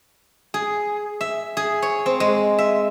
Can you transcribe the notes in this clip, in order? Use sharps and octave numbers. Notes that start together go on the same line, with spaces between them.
G#4
E5
G#4
C#5
C4
G#3
E5